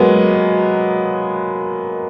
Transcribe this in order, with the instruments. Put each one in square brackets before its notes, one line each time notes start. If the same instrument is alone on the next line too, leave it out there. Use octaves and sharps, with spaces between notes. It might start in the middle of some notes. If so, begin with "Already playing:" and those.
Already playing: [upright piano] F#3 G#3 A#3 B3